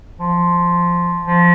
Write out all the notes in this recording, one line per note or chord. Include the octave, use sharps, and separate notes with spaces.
F3
F3